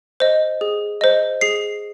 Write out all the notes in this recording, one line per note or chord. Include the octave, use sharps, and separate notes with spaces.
C5 D#5
G#4
C5 D#5
G#4 C7